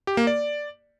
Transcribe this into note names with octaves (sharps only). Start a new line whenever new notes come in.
G4
A#3
D5